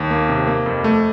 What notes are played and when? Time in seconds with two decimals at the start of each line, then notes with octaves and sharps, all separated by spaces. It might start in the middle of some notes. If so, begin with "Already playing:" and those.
Already playing: D#2
0.10 A#3
0.29 C3
0.47 A#3
0.66 F2
0.84 A3